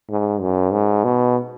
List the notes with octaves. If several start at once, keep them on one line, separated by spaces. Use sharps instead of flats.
G#2
F#2
G#2
B2